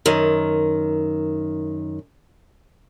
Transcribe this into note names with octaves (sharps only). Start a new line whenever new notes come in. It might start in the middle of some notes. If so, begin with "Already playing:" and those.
F#2 D#3